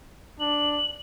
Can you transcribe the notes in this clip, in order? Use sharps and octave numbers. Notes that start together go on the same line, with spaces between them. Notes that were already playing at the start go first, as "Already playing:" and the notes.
D4 F#7